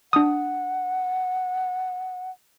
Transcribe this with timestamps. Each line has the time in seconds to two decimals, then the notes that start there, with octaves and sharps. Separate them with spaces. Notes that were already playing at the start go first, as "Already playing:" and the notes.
0.13 D4 F#5 D#6